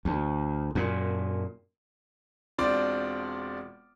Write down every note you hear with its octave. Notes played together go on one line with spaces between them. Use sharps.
D2
F#2 A#2
E1 C4 D4 F4 D5 D6